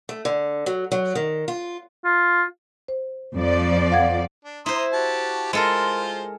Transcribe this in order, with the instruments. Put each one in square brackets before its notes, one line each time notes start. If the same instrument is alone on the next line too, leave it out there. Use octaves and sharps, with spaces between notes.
[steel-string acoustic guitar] A3
D3
F#3
F#3
D#3
F4
[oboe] F4
[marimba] C5
[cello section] F2 F3 D5
[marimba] F5 F#5 G#6
[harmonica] D4
[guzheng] E4 C5 [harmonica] A#5 C6 D#6
[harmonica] F#4 G4 A5
[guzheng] G#3 A4 A#4 [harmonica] F4 C5 C6